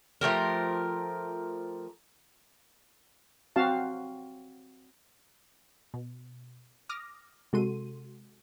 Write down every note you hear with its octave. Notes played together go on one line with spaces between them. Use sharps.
F3 A3 G4 A#4
C4 F#4 F5 A5
B2
D6 D#6 F6 A#6
C3 G#3 F#4 A4 C6 D#7